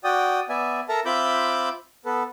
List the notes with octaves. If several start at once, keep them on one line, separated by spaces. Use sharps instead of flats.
F#4 D5 G5 D#6
B3 D5 E5 G#5
A4 A#4 E5 A5 A#5
C4 F4 E5 B5 D6 G6
B3 A4 B4